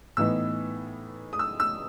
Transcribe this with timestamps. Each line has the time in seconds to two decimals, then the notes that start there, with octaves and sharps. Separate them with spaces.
0.17 A2 E3 B3 D#4 E6
1.33 D#6
1.39 E6
1.60 E6